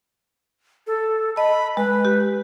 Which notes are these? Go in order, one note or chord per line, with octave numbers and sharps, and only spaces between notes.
A4
D#5 A5 B5
G#3 B4
G4